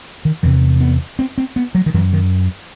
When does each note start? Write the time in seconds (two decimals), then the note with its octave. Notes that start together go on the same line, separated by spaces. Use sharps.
0.25 D#3
0.43 E2 C3 E3
0.81 B3
1.19 C4
1.38 C4
1.56 B3
1.75 F#3
1.86 D#3
1.94 F#2 E3
2.13 D#3